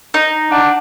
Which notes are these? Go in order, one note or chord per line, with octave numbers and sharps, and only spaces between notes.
D#4
D4 F#5